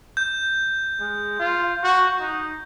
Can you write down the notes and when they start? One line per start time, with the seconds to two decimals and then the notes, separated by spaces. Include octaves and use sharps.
0.17 G6
1.00 G#3
1.39 F4
1.83 F#4
2.20 D#4